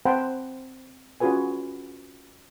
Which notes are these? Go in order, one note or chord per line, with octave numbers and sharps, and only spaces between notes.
C4 C5 F#5 G5 A5 B5
C#4 F4 F#4 G#4 B4 G#5